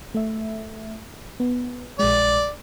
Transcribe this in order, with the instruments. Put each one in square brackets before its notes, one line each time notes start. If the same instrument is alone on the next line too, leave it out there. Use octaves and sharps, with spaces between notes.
[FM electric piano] A3 E5
B3
[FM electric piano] A#1 G#3 [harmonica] D5